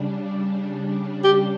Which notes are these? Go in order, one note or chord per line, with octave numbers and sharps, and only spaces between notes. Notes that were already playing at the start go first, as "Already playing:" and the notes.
Already playing: C#3 G3 D4
G4